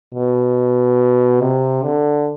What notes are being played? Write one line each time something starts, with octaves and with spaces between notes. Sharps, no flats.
B2
C3
D3